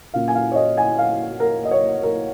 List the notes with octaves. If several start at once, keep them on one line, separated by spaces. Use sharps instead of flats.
A#2 A#3 C#4 F4 F5
G#5
F5
C#5
D#5
G#5
F5
A#4
D#5
C#5
A#4